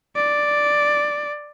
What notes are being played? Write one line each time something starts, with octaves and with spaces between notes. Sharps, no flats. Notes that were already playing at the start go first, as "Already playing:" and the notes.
D5